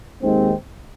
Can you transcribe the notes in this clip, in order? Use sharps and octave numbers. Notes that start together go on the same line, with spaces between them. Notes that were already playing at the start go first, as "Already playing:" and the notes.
D#2 D#3 G#3 C4